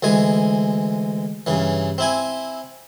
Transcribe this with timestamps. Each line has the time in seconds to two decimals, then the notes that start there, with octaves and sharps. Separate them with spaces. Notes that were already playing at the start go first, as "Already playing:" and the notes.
0.03 D2 E3 G#3 G#5
1.47 G2 C#3 E3
1.98 C4 E4 G#5